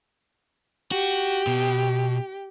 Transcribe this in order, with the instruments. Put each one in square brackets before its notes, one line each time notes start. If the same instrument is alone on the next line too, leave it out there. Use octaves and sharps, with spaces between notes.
[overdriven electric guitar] F#4 [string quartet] G4
[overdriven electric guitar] B2